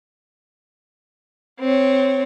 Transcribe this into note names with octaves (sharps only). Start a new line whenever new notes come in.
C4 C#5